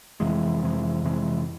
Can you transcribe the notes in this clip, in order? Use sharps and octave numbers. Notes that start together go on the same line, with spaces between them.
F2 C3 E3 G#3
F2 C3 E3 G#3
F2 C3 E3 G#3